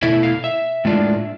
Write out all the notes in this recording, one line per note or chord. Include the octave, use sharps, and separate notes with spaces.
B2 A3 E4 E5
F5
E5
A2 G#3 D4 F4